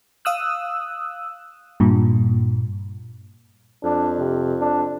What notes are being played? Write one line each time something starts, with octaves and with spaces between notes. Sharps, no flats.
F5 D#6 E6 F#6
G2 A#2
F2 D4
C3
D4